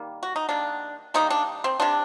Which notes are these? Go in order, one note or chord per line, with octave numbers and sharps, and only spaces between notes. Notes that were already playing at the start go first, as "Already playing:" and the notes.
Already playing: D#3 G3 A#3
F#4
D#4
D#3 G3 A#3 D4
D#3 G3 A#3 C4 D#4
D4
C4
C3 G3 C4 D4